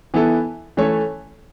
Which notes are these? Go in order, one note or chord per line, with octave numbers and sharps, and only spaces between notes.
E3 B3 E4 A4
E3 A3 C#4 A4 C#5